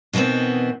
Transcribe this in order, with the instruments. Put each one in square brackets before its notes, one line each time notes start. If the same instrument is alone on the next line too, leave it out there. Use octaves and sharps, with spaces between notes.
[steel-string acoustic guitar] B2 D#3 E3 B3 C4